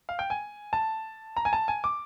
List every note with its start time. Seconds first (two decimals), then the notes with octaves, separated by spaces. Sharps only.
0.09 F5
0.19 G5
0.30 G#5
0.73 A5
1.37 A#5
1.45 G#5
1.53 A5
1.68 G#5
1.84 D6